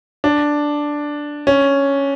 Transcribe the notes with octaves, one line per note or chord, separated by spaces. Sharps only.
D4
C#4